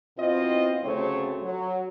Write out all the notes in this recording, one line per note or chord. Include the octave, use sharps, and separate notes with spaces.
B2 C4 E4 F4 C5 D#5
D2 C#3 F#3 A3 C4 C#5
F#3